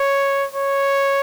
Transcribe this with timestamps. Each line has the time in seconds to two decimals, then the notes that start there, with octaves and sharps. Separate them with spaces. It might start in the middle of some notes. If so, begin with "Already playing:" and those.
Already playing: C#5
0.54 C#5